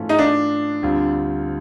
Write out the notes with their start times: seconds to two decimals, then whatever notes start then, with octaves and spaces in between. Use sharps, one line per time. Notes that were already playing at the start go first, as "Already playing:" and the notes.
Already playing: G#2 E3 A3 C#4 F4
0.09 D#4
0.18 D4
0.83 D2 D3 G3 C4 F4